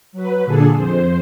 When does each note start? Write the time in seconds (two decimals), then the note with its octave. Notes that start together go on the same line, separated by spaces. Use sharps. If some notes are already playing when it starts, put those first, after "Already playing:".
0.12 F#3 B4
0.45 A#2 D3 D4 G#4 A4
0.75 F2 C5